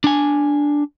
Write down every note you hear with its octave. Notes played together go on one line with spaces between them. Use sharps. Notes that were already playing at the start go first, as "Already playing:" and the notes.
D4 G#5